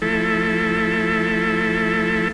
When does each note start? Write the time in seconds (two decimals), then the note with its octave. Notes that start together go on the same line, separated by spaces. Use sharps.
0.02 F3 A3 E4 A4